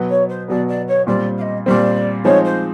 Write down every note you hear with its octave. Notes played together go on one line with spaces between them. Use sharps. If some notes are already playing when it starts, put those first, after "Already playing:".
Already playing: B2 F#3 B3
C#5
C5
B2 F#3 B3 D5
D5
C#5
A#2 G3 C4 D5
F5
D#5
A#2 G3 C4 D5
F3 G#3 C4 D#4 C#5
C5